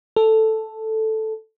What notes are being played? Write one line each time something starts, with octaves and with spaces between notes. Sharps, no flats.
A4